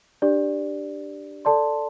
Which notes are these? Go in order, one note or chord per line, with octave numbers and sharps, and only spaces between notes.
D4 G4 D5
A4 D5 A5 C6